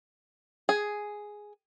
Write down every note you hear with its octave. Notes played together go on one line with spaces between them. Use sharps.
G#4